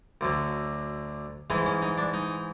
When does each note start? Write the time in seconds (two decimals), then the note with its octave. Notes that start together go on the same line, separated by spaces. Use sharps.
0.21 D2 D3 F#3
1.50 G#2 E3 G#3 D#4
1.66 C#4
1.82 D#4
1.98 D4
2.14 D#4